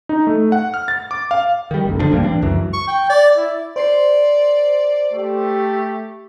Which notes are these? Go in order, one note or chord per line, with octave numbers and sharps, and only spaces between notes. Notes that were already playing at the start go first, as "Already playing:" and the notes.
D#4
A3
F#5
F6
A6
D6
F5
D#3 G3
F#1 B1
D3 F3 D4
D1 G2 G3 A#3
E3 C4 D4
C#2 F#2 E3
C#6
G5
D5
E4
C5 D5 C6 C7
A3 G4